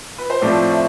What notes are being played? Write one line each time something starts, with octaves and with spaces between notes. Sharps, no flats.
B4
C5
A2 F3 A3 C4 D5
E5